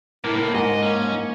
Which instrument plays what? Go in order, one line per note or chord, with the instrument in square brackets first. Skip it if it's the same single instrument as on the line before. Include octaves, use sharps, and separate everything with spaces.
[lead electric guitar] C#2 A2 [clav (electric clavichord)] A#3 [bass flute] E4
[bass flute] A#3 [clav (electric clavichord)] A#4
[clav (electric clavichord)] G#2 F#5 [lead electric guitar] D#5
[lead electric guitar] C#4